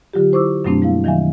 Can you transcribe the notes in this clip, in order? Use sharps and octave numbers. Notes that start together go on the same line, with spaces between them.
D3 F#3 F4 G4
E4 C5 C#6 D6 E6
F#2 B2 F#3 A3 C4 D4
G3 A#3 E4 F5
D#3 E3 F#3 E5 F5 G#5